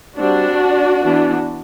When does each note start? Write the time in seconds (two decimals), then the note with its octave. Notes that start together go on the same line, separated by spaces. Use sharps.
0.17 G3 C4 D4 F#4
1.03 E3 B3 D4